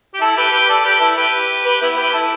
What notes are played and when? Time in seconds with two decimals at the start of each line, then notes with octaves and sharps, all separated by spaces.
0.14 G4
0.21 E4 A4
0.37 G4 B4
0.52 G4 B4
0.68 A4 D5
0.84 G4 B4
1.00 E4 A4
1.17 G4 B4
1.66 G4 B4
1.82 B3 E4
1.97 G4 B4
2.13 E4 A4